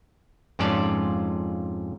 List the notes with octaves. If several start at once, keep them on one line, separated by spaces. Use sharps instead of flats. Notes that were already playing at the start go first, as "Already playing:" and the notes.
F2 G#2 C#4 F4 D5 A5